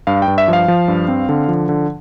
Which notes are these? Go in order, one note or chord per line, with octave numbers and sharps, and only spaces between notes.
G2 F5
G5
G2
E5
F3
F5
F3
G2
C4
D3
F3
D3